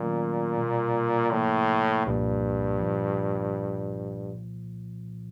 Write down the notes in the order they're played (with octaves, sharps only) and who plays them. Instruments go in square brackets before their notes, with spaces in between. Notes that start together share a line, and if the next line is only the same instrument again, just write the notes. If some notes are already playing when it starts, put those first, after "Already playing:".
Already playing: [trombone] A#2 [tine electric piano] D#3 F#3 A3 C#4
[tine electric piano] B2 G3 A#3
[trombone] A2 [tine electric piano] C3 F3 A#3
[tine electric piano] C2 A#2 F3 A#3 [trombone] G2
[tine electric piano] A#2 F3